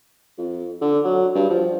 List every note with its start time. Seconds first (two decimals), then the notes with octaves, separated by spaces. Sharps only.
0.38 F2
0.81 D3
1.04 F#3
1.35 G2
1.50 F3